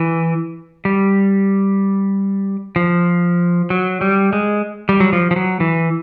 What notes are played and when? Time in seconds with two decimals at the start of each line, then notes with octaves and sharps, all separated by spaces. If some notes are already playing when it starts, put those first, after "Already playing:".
Already playing: E3
0.85 G3
2.76 F3
3.70 F#3
4.01 G3
4.33 G#3
4.89 G3
5.00 F#3
5.13 F3
5.31 F3
5.36 F#3
5.60 E3